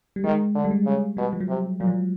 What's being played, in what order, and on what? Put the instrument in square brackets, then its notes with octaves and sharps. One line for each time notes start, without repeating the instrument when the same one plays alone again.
[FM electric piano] G3
[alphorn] D#3 [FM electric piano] G#3
[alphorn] D3
[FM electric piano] G3
G#3
[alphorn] C#3
[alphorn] B2 [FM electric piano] G3
[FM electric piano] F3
F#3
[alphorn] C3
[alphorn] A#2 [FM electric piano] F#3
[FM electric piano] F3